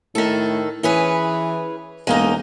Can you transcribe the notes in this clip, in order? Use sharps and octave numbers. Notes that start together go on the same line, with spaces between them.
A2 D#3 A4
E3 C#4 G#4 B4
E1 G#3 A#3 D#4